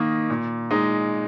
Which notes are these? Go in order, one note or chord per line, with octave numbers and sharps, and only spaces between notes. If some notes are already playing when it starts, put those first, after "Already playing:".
Already playing: D#3 A#3 D#4
A#2
G#3 D#4